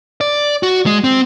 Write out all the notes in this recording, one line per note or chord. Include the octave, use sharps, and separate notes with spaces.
D5
F#4
G#3
C4